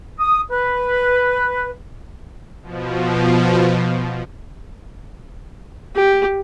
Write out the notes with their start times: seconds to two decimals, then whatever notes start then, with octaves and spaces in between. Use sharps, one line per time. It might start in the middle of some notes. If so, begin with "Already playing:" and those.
0.20 D#6
0.51 B4
2.62 B2 F3
5.95 G4